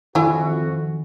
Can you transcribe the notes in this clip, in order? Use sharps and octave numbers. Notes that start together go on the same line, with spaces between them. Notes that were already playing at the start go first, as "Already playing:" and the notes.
F2 D#3 E4 F#4 G#5